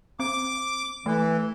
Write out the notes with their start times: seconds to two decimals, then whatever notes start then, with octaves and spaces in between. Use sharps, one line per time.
0.20 C4 D6
1.06 E3 A3